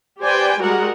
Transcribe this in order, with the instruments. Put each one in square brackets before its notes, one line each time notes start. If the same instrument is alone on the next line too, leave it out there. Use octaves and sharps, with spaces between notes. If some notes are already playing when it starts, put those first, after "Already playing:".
[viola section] G4 B4 C5 D5 G5 G#5
G3 G#3 F#4 G#4 A#4 F#5